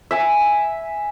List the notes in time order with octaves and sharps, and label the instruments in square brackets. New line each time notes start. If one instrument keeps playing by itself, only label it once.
[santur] E5 G#5